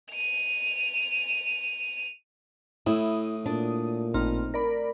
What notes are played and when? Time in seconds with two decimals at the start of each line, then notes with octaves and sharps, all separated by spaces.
0.12 D#7 F7
2.87 A2 E4 D#6
3.46 A#2 D4
4.14 A1 C4 D#4 F6
4.54 A#4 D5 B5